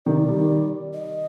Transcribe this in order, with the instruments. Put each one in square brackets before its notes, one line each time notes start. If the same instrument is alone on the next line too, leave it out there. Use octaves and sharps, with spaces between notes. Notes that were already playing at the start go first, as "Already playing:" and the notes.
[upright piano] C3 D#3 [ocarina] D5
[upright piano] D#3 G3
[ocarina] D#5